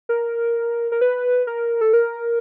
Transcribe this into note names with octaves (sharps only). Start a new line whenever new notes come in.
A#4
A#4
B4
A#4
A4
A#4